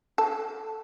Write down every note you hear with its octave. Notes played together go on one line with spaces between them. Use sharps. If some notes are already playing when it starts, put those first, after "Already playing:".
A4